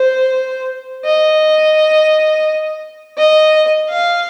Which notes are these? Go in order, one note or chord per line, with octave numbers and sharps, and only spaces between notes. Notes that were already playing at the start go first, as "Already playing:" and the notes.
Already playing: C5
D#5
D#5
F5